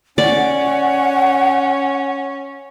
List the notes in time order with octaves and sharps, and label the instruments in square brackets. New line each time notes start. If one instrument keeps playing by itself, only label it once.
[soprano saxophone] C#4 [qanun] D5 [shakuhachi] F#5